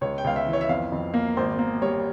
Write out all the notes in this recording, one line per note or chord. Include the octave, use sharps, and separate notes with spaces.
C#2 C#5
G5
C#2 F5
E5
E3
C#5
E5
F2 F5
F2
A#3
G#1 C5
A#3
G3 C#5